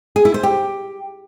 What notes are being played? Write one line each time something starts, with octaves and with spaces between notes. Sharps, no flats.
G#4
E4
C5
G4